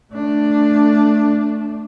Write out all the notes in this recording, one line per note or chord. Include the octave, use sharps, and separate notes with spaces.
A3 D4